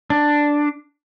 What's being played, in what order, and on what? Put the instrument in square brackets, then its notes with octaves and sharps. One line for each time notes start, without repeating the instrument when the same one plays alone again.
[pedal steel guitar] D4